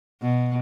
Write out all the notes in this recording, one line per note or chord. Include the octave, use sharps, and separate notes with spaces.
B2